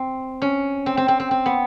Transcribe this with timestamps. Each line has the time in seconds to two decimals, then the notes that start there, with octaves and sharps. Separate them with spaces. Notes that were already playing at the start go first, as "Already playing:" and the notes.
Already playing: C4
0.42 C#4
0.86 C4
0.97 C4
1.08 C4
1.20 C4
1.31 C4
1.46 B3